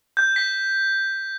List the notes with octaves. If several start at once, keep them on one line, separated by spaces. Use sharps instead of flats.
G6
B6